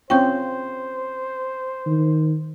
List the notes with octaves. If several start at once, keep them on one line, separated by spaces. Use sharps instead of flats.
C4 C#4 F4 C5 G5 C#6 G6
D#3